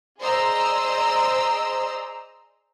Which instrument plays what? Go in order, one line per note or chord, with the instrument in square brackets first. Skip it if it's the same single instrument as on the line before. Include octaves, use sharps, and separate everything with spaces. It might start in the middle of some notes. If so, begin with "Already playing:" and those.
[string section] G#4 C5 D5 D#5 A#5 E6